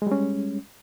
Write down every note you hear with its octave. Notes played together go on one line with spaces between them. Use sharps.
G3 G#3 C#4